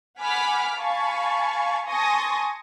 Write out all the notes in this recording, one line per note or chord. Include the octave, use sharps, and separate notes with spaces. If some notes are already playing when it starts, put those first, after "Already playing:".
F#5 G#5 B5 D6 F6 B6
F5 G#5 A5 B5 C#6
G#5 A5 C6 C#6 D#6 A#6